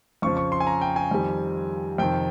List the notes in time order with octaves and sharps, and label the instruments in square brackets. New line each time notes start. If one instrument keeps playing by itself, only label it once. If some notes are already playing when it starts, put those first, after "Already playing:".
[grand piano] F2 C#3 F3 C#6
C#6
C6
G#5
A#5
G5
G#5
F2 D#3 G3
F2 C3 D#3 G5